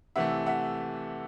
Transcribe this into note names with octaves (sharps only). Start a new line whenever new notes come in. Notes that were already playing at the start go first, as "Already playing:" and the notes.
C3 E3 A3 E5 F#5
E5 F#5